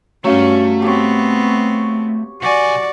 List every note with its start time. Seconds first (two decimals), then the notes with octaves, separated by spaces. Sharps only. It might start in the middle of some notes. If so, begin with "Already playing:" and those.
0.24 G2 F#3 A3 C#4 F5
0.82 B3 C4 G4 C#5
2.42 B1 F#4 D5 G#5